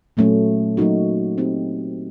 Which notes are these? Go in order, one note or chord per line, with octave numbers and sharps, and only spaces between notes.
A#2 F#3 A3 C#4
F#3 A#3 D#4 F#4
C4 D#4 G4